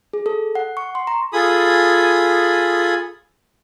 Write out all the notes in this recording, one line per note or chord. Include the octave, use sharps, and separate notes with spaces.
G#4
A4
F#5
C#6
C6
A#5
F4 G#4 A4 G#5 B5 D#6